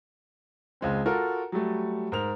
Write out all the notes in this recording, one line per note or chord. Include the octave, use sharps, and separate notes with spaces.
C#2 G#3 C4
F4 F#4 A4 A#4
F#3 G3 A3
G#2 A#4 F7